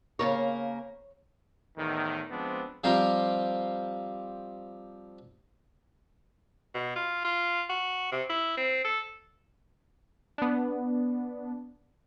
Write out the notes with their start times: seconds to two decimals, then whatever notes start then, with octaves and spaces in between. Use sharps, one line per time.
0.19 C#3 A#3 A#4 C#5
1.77 E2 A2 D#3
2.30 F3 G#3 B3 C4 D4
2.84 F3 G3 C4 F4 G4 A#4
6.74 B2
6.96 F4
7.24 F4
7.69 F#4
8.12 C3
8.30 E4
8.57 C4
8.85 A4
10.38 B3 D4